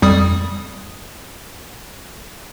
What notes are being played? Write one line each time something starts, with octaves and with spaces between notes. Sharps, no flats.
F2 G3 D#6